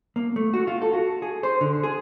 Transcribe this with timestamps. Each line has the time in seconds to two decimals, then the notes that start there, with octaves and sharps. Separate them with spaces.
0.16 A#3
0.36 A3
0.54 F#4
0.67 F4
0.82 A4
0.93 F#4
1.22 G#4
1.43 C5
1.61 D3
1.83 G#4